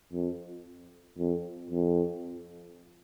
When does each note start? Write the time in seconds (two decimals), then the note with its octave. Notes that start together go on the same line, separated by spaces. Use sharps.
0.13 F2
1.18 F2
1.71 F2